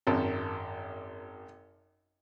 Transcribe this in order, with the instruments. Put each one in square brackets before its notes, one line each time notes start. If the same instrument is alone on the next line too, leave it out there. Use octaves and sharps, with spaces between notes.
[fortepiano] G#1 F#2 A5